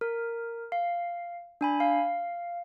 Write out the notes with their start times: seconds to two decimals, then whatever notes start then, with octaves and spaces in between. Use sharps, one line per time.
0.01 A#4
0.72 F5
1.61 D4 G#5 B5
1.80 F5